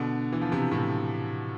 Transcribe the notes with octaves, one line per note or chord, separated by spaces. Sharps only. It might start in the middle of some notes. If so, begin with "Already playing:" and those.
Already playing: B2 D3
E3
F3
C3 E3
A2 C3